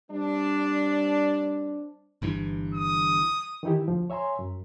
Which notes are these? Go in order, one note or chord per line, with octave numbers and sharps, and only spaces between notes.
G3 C4 D4
G1 G2 E3
D#6
D#3 E3 D#4 E4 G4
D2 F3
C#5 E5 G#5 A#5 C6
F#2